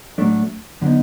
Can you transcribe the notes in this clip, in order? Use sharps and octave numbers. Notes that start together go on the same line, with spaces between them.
A2 F#3 A3 D4
D3 F#3 B3 D#4